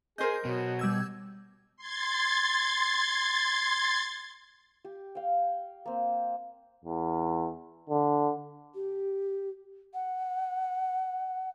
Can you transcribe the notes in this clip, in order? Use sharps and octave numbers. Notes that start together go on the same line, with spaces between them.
G#4 A#4 C5 D#5 G6
B2 F#3
G3 E6 G#6
C6 G#6 A6
G4
F5 G5
A#3 C4
E2
D3
G4
F#5